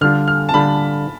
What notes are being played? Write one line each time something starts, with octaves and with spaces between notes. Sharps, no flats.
D3 G3 D4 F4 F6
F6
A5
D3 G3 D4 F4 B5